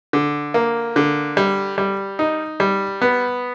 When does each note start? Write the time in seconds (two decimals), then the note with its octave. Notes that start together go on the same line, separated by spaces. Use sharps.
0.13 D3
0.54 A#3
0.96 D3
1.37 G3
1.78 G3
2.19 D#4
2.60 G3
3.01 B3